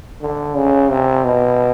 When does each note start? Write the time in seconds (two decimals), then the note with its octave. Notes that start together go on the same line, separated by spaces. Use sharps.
0.22 D3
0.56 C#3
0.90 C3
1.25 B2